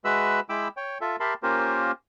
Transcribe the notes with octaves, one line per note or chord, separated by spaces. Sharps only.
G#3 F#4 B4 E5 B5 E6
G#3 E4 G5 B5 D6 E6
C#5 G5
F4 A4 E5
G4 A#4 E5 A5 B5 C6
A#3 C#4 F4 G4 A#4 C5